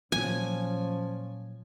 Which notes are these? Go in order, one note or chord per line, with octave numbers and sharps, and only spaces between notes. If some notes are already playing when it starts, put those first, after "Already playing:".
A#2 F3 F#3 A#3 C#4 G#5